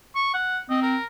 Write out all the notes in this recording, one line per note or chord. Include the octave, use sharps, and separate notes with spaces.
C#6
F#5
C4 D#5
A#4